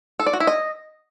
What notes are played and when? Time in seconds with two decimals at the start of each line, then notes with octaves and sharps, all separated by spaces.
0.20 A4
0.26 D5
0.33 F#4
0.40 E4
0.47 D#5